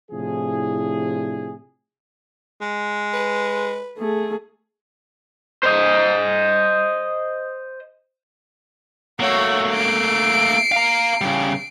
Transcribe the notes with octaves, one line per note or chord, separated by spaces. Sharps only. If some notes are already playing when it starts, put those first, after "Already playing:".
A2 C3 F3 D4 E4 G#4
G#3
B4
A3 G#4
C5 D#5
A3 A#3 F#4 C#5
C7 D7
F5 A#5
C#3 G3